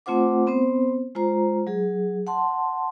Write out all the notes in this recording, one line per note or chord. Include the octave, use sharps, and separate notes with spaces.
A3 C4 F4 C5 F#5 D6
B3 C4 C5
G#3 F4 C5 A#5
F#3 G#4
F#5 A5 C6